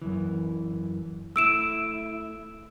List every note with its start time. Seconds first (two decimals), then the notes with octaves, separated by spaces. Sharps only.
0.02 F#2 E3
1.36 A3 E4 E6 D7 E7